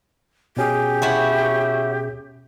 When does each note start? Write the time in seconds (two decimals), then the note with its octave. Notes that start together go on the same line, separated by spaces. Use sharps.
0.57 B2 C#4 G4 G#4
1.02 E4 F#4 C#5